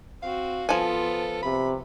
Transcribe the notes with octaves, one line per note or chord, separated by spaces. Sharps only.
C4 F#4 F5
F3 B3 F4 A4 G#5
C3 B5